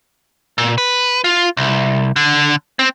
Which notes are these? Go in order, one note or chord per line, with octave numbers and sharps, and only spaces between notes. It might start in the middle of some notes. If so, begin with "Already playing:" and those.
A#2
B4
F4
C2
D3
C4